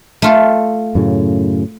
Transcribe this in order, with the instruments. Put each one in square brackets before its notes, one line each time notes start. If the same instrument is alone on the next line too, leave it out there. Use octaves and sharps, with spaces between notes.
[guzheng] A3 F4 A4
[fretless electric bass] F#2 A2 C#3